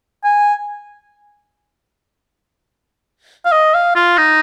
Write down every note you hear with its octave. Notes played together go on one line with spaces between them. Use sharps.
G#5
F5
D#5
F5
F4
D#4